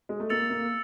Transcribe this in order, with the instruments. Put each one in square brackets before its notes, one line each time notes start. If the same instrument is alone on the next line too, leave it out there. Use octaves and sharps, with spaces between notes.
[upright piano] G#3
A3
[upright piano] A#3 [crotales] E6 A6 C#7 F7
[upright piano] A#3